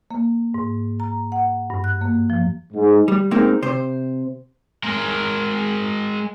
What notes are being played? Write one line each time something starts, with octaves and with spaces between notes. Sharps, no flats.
A#3
G#2
A#5
F#5
G2
F#6
A#3
F3
G#2
G3
G#3 A#3 C4 D#4
C3 C5
G#3 A#4